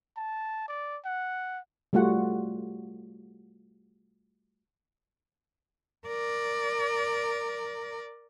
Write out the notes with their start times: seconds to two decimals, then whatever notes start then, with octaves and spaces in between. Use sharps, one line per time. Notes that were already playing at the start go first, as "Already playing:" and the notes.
0.17 A5
0.69 D5
1.06 F#5
1.93 G3 A3 F4 F#4 F#5
6.07 A#4 D5